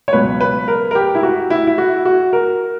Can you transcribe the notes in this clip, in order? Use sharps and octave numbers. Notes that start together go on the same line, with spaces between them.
C#5
C#2 B2 F#3 B4
B4
A#4
A#4
G4
E4
F#4
E4
E4
F#4
F#4
A#4